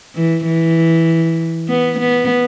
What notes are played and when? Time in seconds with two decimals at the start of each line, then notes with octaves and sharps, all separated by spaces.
0.15 E3
0.46 E3
1.68 B3
1.99 B3